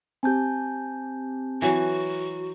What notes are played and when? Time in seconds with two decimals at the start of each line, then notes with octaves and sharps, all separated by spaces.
0.23 C4 G4 G#5 A5 G6
1.62 E3 F#3 F#4